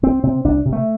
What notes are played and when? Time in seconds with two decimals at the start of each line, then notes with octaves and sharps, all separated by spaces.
0.03 C2 C4
0.23 C3 C4
0.45 C2 D4
0.65 C3
0.72 A3